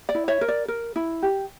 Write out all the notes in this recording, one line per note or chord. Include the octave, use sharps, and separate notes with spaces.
D5
E4
C#5 E5
A#4
D5
A#4
E4
G4